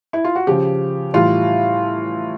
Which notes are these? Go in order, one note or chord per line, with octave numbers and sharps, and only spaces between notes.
E4
F4
F#4
C#3 F3 G4
A2 E3 G3 F4